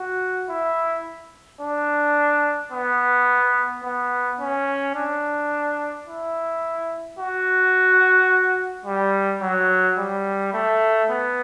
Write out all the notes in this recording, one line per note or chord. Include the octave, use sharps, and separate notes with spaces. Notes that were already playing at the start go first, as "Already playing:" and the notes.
Already playing: F#4
E4
D4
B3
B3
C#4
D4
E4
F#4
G3
F#3
G3
A3
B3